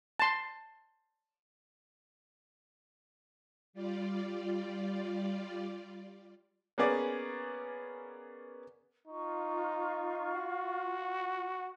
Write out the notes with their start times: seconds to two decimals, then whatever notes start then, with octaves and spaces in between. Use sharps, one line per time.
0.19 A5 C6
3.73 G3 F4 D5
6.78 A#3 B3 C#4 G#4 D5
9.07 D#4 F4 C#6
10.34 F#4